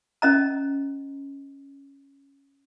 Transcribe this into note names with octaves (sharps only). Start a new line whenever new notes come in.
C#4 D#5 A#5